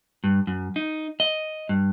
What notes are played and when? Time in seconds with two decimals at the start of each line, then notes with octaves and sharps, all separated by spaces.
0.24 G2
0.47 F#2
0.76 D#4
1.20 D#5
1.69 G2